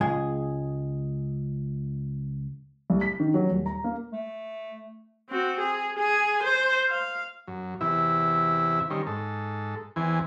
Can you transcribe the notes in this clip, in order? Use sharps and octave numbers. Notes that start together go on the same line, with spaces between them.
C#2 G#3 G#4
C2
B6
D#3
F#3
D#1
A#5
A#3
A3
C4 F#4
G#4
G#4 G#5
C5
F5
F#2
E2 C3 E4 E5
D#3 G3 C4 C#4
G#2 A4
E2 E3 C4 G#5